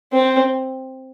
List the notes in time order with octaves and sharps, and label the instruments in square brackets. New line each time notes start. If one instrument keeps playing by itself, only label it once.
[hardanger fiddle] C4